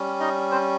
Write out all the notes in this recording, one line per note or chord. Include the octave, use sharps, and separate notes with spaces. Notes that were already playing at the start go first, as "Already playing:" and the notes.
Already playing: G3 C#4
D#4 D#5
C4 C5